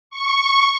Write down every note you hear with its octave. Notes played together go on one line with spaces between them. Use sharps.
C#6